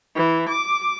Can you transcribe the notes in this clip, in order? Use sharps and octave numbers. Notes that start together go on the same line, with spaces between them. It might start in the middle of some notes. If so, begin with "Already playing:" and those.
E3
D6